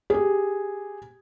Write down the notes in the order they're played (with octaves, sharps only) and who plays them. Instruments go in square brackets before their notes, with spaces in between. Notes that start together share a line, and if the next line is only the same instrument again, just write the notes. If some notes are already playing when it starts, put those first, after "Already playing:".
[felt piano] G4 G#4